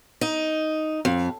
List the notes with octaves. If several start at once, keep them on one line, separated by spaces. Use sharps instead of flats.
D#4
F2